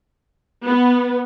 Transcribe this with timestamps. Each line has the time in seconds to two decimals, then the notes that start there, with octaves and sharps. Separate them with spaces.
0.66 B3